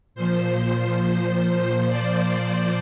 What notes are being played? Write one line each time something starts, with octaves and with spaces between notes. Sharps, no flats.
A#2 F3 C5
D5